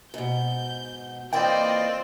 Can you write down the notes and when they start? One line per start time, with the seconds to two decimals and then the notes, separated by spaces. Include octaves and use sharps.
0.14 G#2 B2 G6
1.33 E3 A#3 C4 F4 A#4 D5 D#5 G5